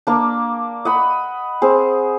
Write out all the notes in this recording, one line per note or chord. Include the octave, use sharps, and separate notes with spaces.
A#3 D4
D#5 F#5 B5
C4 G#4